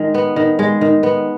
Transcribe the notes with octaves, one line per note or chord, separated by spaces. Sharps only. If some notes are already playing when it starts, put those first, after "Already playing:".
Already playing: D#3 G#3
B3
D#3
G#3
D#3
B3